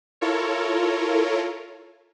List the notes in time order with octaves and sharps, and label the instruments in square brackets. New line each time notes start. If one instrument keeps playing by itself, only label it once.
[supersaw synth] E4 F4 A4 A#4 C#5